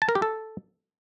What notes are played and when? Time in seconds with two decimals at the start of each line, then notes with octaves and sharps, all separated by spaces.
0.02 A5
0.09 A#4
0.15 G4
0.22 A4